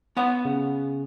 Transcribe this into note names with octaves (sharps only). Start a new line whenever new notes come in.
B3 C#5 F#5
C#3